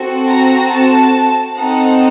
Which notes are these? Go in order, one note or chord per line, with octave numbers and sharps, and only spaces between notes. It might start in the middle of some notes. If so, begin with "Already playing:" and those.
Already playing: C4 F#4 A4
A#5
A5
C4 D#4 A4 F#5